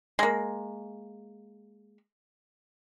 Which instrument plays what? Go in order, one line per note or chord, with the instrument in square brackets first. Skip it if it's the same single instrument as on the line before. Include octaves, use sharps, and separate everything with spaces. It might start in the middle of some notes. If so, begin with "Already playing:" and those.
[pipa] G#3 A#3